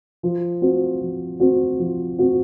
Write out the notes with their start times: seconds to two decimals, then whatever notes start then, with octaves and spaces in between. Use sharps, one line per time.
0.23 F3
0.62 C4 F#4
1.01 F3
1.40 C4 F#4
1.79 F3
2.19 C4 F#4